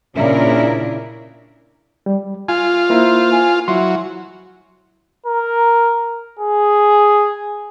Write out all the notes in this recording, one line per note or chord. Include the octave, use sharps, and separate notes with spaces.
A#2 C#3 C#4 D4 E4 A#4
G3
F4 G#5
A#3 E4 A#4 C5
G#5
F#3 E4 C6
A#4
G#4